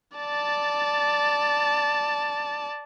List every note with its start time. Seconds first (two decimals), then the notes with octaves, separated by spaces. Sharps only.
0.17 D5 A5